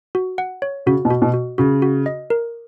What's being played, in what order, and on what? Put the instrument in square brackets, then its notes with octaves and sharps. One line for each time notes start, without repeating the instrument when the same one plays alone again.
[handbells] F#4
F#5
C#5
[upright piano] C#3 [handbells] F#4
[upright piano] B2
[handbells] F#4
[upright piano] B2
[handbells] F#4
[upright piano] C#3 [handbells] F#4
[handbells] F#4
D#5
A#4